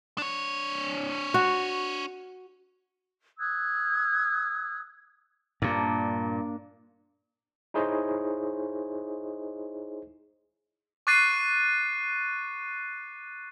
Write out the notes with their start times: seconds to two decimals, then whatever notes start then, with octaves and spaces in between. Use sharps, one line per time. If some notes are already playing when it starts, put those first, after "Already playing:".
0.18 D4 C#5
1.34 F#4
3.39 D#6 E6 F#6 G#6
5.62 G2 A#2 A#3 D4
7.74 D#4 E4 G#4 C5 C#5 D#5
11.07 C#6 D6 F#6 A6 C7 D#7